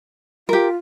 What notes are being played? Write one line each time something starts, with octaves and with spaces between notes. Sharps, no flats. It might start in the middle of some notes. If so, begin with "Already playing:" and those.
F4 G4 A#4